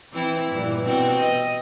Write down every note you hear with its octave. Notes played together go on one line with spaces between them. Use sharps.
E3 C4 E4
G2 A#2 E3
B2 C4 F#4
D#5